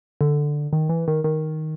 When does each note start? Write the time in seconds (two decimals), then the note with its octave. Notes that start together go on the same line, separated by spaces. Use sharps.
0.21 D3
0.73 D#3
0.89 E3
1.08 D#3
1.24 D#3